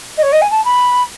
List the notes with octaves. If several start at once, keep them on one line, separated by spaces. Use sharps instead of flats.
D#5
C#5
D#5
G#5
A5
B5